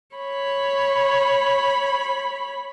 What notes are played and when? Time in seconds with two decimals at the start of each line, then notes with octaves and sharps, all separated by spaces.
0.16 C#5 B5